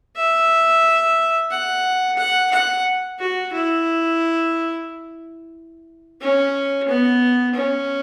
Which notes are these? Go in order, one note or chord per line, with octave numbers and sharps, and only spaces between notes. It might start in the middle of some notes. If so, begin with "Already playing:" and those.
E5
F#5
F#5
F#5
F#4
E4
C#4
B3
C#4